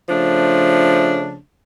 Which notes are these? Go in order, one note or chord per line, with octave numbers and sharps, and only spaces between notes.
C#3 F3 A3 D4